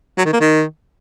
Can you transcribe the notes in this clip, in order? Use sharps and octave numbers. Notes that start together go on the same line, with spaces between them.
F#3
D#3
A#3
D#3